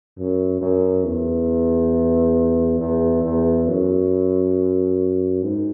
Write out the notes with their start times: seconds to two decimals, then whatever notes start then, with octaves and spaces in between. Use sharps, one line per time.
0.18 F#2
0.62 F#2
1.05 E2
2.80 E2
3.24 E2
3.68 F#2
5.43 G#2